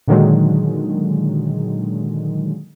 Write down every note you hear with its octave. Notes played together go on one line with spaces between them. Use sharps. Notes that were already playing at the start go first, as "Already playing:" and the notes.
A#2 D3 D#3 F#3 G#3